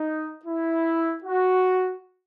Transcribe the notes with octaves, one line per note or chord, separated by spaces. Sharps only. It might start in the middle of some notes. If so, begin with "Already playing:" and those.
Already playing: D#4
E4
F#4